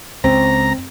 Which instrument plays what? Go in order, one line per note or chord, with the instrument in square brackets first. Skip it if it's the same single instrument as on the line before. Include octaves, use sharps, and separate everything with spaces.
[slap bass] C#2 [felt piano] C4 [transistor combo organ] A#5